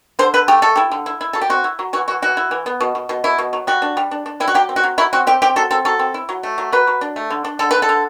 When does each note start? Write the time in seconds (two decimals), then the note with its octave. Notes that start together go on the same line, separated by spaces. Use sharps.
0.19 D3 C5
0.34 D3 B4
0.48 A3 G4
0.62 A3 A4
0.76 E4 G4
0.91 D3
1.06 E4
1.21 E4
1.33 F#3 A4
1.41 G4
1.49 C4 F#4
1.64 E4
1.79 F#3
1.93 E3 F#4
2.08 E3 F#4
2.22 E3 F#4
2.37 E4
2.51 E3
2.66 B3
2.81 B2
2.95 B2
3.09 B2
3.24 B2 E4
3.38 B2
3.53 F#3
3.67 G3 F#4
3.82 D4
3.97 G3
4.11 D4
4.26 D4
4.40 G3 E4
4.48 F#4
4.54 F#3 G4
4.69 C4
4.76 F#4
4.84 F#3
4.98 F#3 E4
5.13 C4 F#4
5.27 C4 G4
5.42 C4 G4
5.56 F#3 A4
5.71 C4 A4
5.85 F#3 A4
5.99 C4
6.14 E4
6.29 F#3
6.43 A3
6.58 F#3
6.72 F#3 B4
6.87 F#3
7.01 D4
7.16 A3
7.30 D3
7.44 D4
7.59 D3 A4
7.71 D3 B4
7.82 A4
7.89 D3